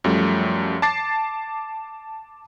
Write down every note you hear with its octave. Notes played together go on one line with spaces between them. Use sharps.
F#2 F3 G3 A3
A5 D6 A6 C7